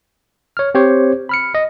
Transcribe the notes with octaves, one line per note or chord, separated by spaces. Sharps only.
C#5 F6
C4 G4 C5 C#5
B5 F6 C#7
D#5